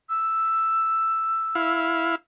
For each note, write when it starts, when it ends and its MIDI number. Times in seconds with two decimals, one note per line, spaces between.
0.09 1.85 88
1.55 2.15 64
1.55 2.15 77